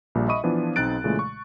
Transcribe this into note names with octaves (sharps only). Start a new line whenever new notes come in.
A#1 A#2 G3
D#5 E5 B5 C#6 D#6 D#7
E3 F3 B3 D4
B1 C4 D#4 F#6 A6 D7
A#2 C#3 E3 G#3 A3
C#6